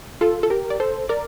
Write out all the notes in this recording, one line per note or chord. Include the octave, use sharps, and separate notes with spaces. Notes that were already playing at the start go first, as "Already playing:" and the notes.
F4 A4
A4
G4 A#4
D5
A4 C5
A#4 D5